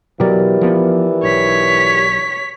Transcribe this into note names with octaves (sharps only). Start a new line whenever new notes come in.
B2 E3 F#3 G4 A#4 D5
F3 B3
B1 C#5 B6